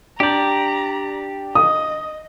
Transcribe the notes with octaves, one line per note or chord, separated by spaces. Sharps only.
D4 G4 D5 A#5 G6
D#5 D#6